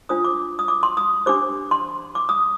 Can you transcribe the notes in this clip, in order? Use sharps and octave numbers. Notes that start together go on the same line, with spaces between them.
D4 F4 C5 D#6
D6
D#6
D6
C6
D#6
D4 G4 C5 D6
C6
D6
D#6